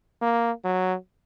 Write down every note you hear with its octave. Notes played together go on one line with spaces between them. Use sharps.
A#3
F#3